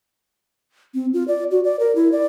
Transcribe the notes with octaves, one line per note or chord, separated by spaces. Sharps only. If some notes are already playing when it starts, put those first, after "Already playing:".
C4
F4
D5
F#4
D5
A#4
E4
D5